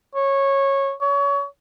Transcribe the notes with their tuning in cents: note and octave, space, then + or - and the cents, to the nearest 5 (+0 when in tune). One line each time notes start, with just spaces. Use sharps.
C#5 -15
C#5 +30